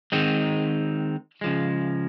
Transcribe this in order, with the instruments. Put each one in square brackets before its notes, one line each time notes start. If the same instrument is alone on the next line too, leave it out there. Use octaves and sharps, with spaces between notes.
[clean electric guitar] D#3 G#3 C4 D#4
C#3 F3 G#3